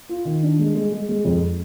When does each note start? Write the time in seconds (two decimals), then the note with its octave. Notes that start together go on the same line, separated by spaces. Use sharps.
0.09 F4
0.25 D#3
0.43 D4
0.59 G#3
0.75 G#3
0.92 G#3
1.09 G#3
1.25 F2